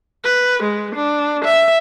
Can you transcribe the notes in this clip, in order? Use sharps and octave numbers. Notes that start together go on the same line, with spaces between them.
B4
G#3
D4
E5